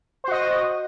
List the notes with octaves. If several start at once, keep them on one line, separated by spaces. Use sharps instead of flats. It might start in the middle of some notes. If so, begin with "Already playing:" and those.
F#4 C5 D#5